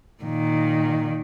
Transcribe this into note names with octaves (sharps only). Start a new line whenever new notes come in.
A#2 D#3